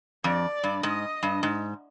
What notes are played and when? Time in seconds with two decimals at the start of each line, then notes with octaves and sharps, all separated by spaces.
0.24 F2 D5
0.64 G2
0.83 G#2 D#5
1.23 G2
1.43 G#2